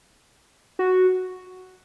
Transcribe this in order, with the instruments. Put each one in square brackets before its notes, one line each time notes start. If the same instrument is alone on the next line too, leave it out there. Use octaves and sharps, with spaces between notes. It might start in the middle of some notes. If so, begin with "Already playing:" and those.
[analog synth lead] F#4